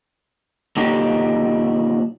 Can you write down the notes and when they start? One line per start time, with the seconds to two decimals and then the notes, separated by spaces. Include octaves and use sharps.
0.76 A#2 D3 F#3 D4 D#4 G4